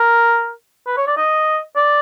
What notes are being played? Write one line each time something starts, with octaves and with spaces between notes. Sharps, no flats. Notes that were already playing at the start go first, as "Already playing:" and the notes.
Already playing: A#4
B4
C#5
D5
D#5
D5